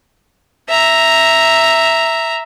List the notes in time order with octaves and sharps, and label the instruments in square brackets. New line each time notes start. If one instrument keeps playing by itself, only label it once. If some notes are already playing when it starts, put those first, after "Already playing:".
[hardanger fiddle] E5 A#5